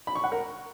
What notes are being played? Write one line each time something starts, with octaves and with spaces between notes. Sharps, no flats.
B5
C#6
F#5
A#4